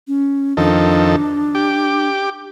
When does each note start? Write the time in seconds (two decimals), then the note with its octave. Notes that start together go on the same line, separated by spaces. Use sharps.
0.08 C#4
0.57 F2 D#3 D4 A4
1.55 G4 D6